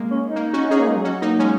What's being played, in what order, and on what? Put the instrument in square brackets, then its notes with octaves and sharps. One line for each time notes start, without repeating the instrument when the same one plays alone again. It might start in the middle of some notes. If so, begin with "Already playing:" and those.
Already playing: [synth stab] G#3 A#3
[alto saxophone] C#4
D#4
[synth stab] A#3
C#4 F#4
[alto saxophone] C#4 [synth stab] D#4 G#4
[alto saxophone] A#3
G#3
F#3
[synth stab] C#4 F#4
A#3 D#4
G#3 C#4